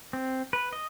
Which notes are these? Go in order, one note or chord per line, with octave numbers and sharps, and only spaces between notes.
C4
B4
D#5